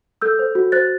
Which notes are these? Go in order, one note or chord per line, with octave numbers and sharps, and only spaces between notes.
A4 E6 G6
C5
F#4
C5 F#6 A6